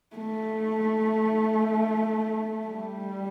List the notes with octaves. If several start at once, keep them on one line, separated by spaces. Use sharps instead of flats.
A3
G3